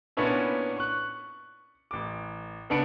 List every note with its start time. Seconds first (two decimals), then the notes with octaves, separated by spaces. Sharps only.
0.17 A#2 B3 C#4 D4 E4
0.77 C#6 F#6
1.91 A1 D6
2.70 C#3 B3 D4 C#7 D7